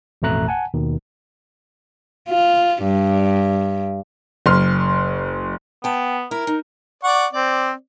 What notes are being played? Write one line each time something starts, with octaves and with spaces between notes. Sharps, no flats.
A1 F2 B2 A3 A#5 F#6
F#5 G#5 A5
D#2 B2 D#3
F4
G2
F#1 C6 F6
B3 G5 A5
E4 A#4
D#4
D5 F#5 C#6
C4 D5